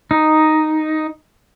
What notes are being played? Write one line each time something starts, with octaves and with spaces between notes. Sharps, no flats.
D#4